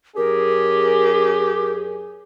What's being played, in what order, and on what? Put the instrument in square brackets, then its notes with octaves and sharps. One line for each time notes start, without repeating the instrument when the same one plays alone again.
[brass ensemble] F#2 C#4 G#4 [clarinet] G4 [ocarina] A#4